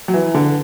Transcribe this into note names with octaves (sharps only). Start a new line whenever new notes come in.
F#3
E3
D3